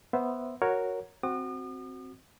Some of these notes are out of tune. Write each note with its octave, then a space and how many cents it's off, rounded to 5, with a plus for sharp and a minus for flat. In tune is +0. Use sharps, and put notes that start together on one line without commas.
B3 +0 C5 +0 E5 +0
F#4 +0 A#4 +0 C#5 +0
C4 +0 F#4 +0 D#6 -45